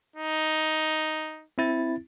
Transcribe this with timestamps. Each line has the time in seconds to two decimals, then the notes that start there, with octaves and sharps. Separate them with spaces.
0.16 D#4
1.58 C4 E4 A6